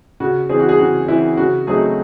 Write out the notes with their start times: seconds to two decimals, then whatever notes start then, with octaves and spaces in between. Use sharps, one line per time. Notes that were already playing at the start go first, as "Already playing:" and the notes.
0.20 C#3 F#4
0.49 E3 C4 G#4
0.59 F#4
0.69 G#4
0.79 C#3 F#4
1.08 E3 C4 E4
1.37 C#3 F#4
1.67 F#3 A3 C4 D#4 G#4